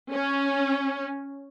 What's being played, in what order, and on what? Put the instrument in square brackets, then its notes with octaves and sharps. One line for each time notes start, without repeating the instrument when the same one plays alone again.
[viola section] C#4